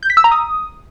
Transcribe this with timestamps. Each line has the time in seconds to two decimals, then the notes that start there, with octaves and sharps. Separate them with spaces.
0.03 G6
0.10 B6
0.17 E6
0.24 A#5
0.31 D#6